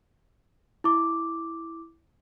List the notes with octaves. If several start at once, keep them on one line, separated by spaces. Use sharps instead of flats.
E4 D6